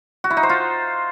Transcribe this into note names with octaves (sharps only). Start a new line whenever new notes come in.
F#4
E4
D#4
C5
F4